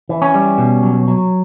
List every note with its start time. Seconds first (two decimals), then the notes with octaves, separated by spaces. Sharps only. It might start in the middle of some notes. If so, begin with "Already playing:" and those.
0.09 E3
0.22 C#4
0.34 G3
0.58 B2
0.83 F#3
1.08 F#3